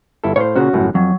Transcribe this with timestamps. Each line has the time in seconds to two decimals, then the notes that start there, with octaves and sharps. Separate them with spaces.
0.24 G1 E4 A4
0.36 A2 C5 C#5 F5
0.56 A#2 C#3 C#4 F#4
0.73 G1 F#2 A2
0.95 F2 F#3